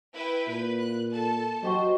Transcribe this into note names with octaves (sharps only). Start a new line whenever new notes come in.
E4 B4 G5
A#2 B4
F#6
A4 A5
F#3 F#4 G4 C5 D#5